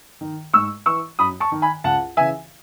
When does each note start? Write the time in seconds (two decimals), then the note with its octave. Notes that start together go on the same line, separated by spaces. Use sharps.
0.21 D#3
0.53 G#2 C#6 E6
0.86 E3 C#6 E6
1.19 F#2 B5 D#6
1.40 A5 C#6
1.52 D#3
1.62 G#5 B5
1.84 C#2 F#5 A5
2.17 C#3 E3 E5 G#5